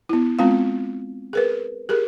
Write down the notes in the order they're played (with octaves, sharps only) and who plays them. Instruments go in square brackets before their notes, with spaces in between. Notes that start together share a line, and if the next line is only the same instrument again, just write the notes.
[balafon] B3 E4
G#3 B3 C4 F4 F5
G#4 A#4 B4
G4 G#4 A#4